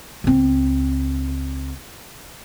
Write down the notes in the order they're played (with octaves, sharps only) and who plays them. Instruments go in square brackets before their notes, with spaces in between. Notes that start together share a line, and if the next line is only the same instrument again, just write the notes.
[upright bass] C#2 C4